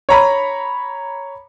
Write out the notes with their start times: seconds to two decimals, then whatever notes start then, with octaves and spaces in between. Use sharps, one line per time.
0.09 C#5 A#5 B5